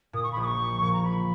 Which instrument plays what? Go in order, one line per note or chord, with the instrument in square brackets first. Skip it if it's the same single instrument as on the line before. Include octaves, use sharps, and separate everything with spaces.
[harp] A#2 [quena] D#6
[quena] C#6
B5
[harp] A#1 [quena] D#6
[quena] C#6
[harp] F3
A#2
[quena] A#5
[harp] F3 [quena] B5